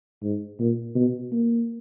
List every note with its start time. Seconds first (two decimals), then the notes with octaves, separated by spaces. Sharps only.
0.23 G#2
0.59 A#2
0.95 B2
1.32 A#3